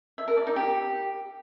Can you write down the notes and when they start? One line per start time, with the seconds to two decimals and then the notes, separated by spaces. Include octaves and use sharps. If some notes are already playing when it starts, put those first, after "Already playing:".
0.18 E5
0.28 A#4
0.37 D5
0.47 D#4
0.56 G4